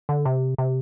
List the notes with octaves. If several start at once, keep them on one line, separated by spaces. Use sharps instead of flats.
D3
C3
C3